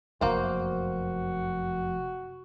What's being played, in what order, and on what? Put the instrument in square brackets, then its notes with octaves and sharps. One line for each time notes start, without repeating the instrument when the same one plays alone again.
[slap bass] F1 F#2 [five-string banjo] A#3 C5 [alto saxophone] F#4